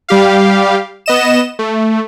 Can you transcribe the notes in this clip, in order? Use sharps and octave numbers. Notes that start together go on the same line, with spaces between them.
G3 G4 F5
B3 D#5 E7
A3